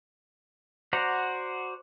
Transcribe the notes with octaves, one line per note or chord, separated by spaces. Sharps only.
F#4 C5 D5 F#5 A#5